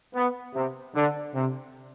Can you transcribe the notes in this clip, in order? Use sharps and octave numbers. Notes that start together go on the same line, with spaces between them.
B3
C3
D3
C3